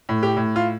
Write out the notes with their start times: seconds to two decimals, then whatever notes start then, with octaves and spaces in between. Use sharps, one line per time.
0.09 A2
0.23 G4
0.36 A2
0.56 F4